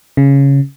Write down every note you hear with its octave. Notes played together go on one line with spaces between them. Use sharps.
C#3